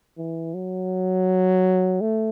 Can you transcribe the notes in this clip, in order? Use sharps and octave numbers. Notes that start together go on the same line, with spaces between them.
E3
F#3
A3